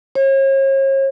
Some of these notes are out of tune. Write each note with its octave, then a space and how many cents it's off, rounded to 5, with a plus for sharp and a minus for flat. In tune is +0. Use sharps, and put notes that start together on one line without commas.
C#5 -40